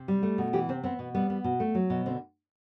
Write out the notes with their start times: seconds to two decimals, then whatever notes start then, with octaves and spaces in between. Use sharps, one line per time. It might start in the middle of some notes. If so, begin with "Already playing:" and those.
Already playing: C3
0.08 G3
0.23 A3
0.38 B2
0.53 E3 G4
0.69 C3 C4
0.83 B3 C4
0.99 B2
1.14 G3 B3
1.30 B3
1.44 B2
1.60 A3
1.75 F#3
1.90 B2
2.06 D3 C4